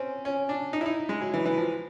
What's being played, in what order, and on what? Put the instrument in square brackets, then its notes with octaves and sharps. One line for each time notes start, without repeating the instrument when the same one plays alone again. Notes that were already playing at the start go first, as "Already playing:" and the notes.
Already playing: [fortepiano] C4 C#4
C#4
D4
D#4
E4
D#4
G#3
F#3
E3
E3
F3